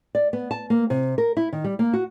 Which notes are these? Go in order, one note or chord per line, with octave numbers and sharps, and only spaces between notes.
D5
B3
A5
A#3
C3
A#4
E4
D#3
G3
A#3
F#4